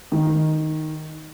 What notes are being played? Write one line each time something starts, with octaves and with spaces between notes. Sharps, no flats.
D#3